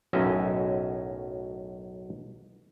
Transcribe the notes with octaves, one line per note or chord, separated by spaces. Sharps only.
B1 F#2 A2 C#4 D#5 E5